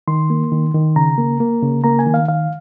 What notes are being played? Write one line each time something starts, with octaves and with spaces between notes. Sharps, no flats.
D#3 C6
A#3
D#3
D#3
C#3 A#5
A#3
A#3
C#3
A#3 A#5
G#5
D#3
F5
D#3 F5